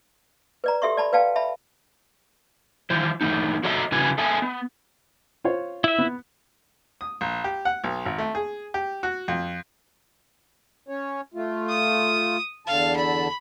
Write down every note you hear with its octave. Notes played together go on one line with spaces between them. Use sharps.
B4 D5 A#5
G4 A4 E5 C6 C#6
D5 A5 B5
B4 D5 F5 G5 A5
E5 A5 B5
D#3 E3 E4 C5
E3 A3 B3 D#4
F#4 A4 C#5 D#5 E5 A#5
C#3 C#4 E4 F#4 B4 G#5
A4 D#5 E5 G#5
B3
F4 C5 C#5
E4 E5
B3
D#6
A#1
G4
F#5
B1
G#1
A3
G#4
G4
F#4
F2
C#4 C#5
A3 F4
D#6
E2 D3 F5 A5
B5